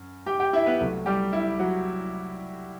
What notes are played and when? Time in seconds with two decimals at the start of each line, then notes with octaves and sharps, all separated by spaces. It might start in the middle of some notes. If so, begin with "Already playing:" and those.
Already playing: F#2
0.26 G4 G5
0.40 G4 G5
0.53 E4 E5
0.66 B3 B4
0.80 C2 C3 F#3 A3
1.06 G3 G4
1.33 E4
1.59 F#3 F#4